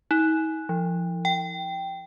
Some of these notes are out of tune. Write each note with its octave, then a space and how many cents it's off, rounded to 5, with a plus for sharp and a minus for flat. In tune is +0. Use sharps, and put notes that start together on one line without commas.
D#4 +45
F3 -20
G5 -5